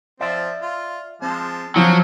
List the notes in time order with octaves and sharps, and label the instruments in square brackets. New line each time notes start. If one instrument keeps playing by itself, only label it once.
[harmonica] F3 C4 [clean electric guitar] D5 E5
[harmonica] F4
[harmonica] F3 G#3 A5 [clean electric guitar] C4
[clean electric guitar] D3 C4 [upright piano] F3 [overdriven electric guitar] F#3 [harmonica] G#5